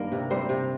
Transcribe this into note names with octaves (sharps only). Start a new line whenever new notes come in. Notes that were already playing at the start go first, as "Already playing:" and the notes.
Already playing: G2 D#3 A#3 A#4
C3
G3 C4 C5
C3